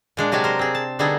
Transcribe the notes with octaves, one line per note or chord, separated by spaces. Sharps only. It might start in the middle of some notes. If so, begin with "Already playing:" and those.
A#2 G#3 D4
C3 F#3 G#3 G4 G#5 A5
A#4 C5
C4 G#4
A5
D3 G3 B3 D#4 G#4 A4